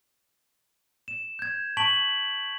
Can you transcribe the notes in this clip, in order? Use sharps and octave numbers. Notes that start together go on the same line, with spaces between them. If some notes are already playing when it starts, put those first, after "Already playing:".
E7
G6 G#6
A5 C#6 B6 D7 F#7